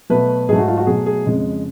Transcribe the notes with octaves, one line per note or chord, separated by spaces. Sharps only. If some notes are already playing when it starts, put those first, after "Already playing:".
B2 F#3 A3 B4
G#2 F#3 A3 G#4
F#4
F4
F#4
B2 F#3 A3 G#4
G#4
F2 C#3 G#3